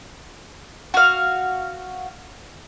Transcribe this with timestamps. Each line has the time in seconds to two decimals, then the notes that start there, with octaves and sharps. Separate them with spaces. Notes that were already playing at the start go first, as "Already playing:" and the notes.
0.94 F#4 F5